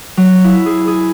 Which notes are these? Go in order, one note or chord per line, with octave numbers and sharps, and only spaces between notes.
F#3
E4
G#4
G#4